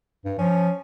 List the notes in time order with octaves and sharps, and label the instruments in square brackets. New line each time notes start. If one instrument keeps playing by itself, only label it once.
[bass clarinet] G2
[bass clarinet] F3 [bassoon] C#4